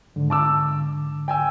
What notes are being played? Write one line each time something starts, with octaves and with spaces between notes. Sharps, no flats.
G#2 D3
A5 D6 E6
G5 G#5 E6